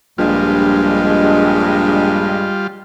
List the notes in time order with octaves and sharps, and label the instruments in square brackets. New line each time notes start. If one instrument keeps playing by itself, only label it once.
[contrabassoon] A#1 [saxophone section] G2 G#3 [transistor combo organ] G3 F4